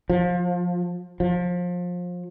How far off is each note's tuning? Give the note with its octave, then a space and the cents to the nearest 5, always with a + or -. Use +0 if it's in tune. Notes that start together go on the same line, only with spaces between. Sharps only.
F3 +25
F3 +25